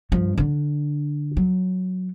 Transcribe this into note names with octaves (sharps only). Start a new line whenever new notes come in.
G2 F3
D3 D4
F#3